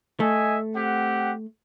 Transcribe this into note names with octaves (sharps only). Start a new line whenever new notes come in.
A3 D#5 E5 G#5
C4 G4 F#5